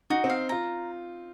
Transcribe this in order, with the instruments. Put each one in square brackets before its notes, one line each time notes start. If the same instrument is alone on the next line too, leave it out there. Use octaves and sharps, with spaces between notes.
[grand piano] D#4 [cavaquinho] F#4
[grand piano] C4
[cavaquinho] F5
[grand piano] F4 [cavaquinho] A#5